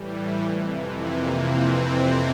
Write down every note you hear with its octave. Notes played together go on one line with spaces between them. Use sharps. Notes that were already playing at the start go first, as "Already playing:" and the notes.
Already playing: A2 E3 G3
G3
F2 C3 E3
F2 C3 E3 A#3
C4
F2 C3 E3